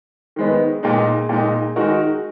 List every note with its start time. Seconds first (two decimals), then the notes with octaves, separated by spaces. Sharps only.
0.36 D#3 G#3 B3
0.83 A#2 G#3 D#4
1.29 A#2 G#3 D#4
1.76 D#3 G#3 D#4 F#4 A#4